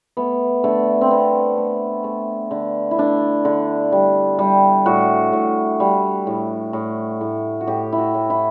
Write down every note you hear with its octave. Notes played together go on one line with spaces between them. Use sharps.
A3 B3
D3 A3
C4
D3 B3
A3
A3
D3
E4
A3 D4
D3
G3
G3
A2 F#4
A2
G3
A2
A2
A2
F#4
A2 G4
E4
F#4
A2
E4